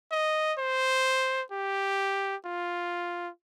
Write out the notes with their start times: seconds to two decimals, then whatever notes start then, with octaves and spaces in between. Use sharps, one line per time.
0.11 D#5
0.59 C5
1.52 G4
2.45 F4